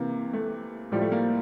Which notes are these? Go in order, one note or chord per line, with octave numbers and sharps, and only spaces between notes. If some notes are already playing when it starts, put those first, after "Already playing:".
Already playing: C3 E3 A#3
A3
A2 F3 G3
A3
A#3